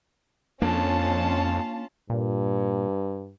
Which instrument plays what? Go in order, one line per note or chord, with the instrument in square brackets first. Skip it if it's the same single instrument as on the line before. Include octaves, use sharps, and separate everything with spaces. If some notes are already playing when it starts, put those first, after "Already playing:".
[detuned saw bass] F2 [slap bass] A#3 D4 [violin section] C#4 F4 A5
[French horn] G2 [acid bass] A#2